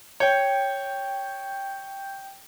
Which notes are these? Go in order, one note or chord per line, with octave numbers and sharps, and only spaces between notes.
C#5 G5 G6